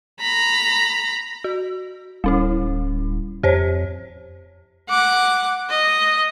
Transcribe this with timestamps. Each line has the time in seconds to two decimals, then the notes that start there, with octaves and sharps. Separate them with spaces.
0.21 A#5 B5
1.44 F#4
2.24 D1 G3 C#4 E4
3.43 F2 G4 C5 C#5
4.89 F#5 D6
5.70 D#5